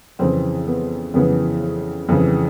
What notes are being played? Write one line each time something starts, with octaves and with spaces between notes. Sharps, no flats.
F2 C#3 E3 C4
B3
F2 C#3 E3 B3
F2 C#3 E3